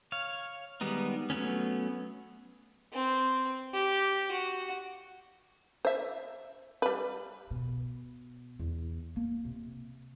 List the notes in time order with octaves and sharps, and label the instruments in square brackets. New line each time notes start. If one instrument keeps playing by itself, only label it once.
[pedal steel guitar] C#5 F5
D#3 G3 G#3 B3 D#4
F#3 A3 B3 C#4
[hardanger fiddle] C4
G4
F#4
[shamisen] C5 E5
G3 B4
[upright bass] B2
E2
A#3
C3